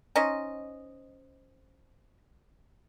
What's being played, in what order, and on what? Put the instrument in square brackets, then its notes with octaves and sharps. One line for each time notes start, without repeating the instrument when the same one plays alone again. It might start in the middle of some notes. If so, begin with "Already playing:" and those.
[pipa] C#4 D#4 C5 D#5